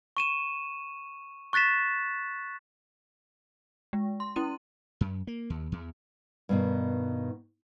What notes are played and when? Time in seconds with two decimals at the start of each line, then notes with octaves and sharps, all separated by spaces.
0.17 C#6 D#7 E7
1.53 C#6 F#6 A6 B6 E7
3.93 G#3
4.20 C6
4.36 C#4 E4 D#7
5.01 F#2
5.27 A#3
5.50 D#2
5.72 E2
6.49 G2 B2 D#3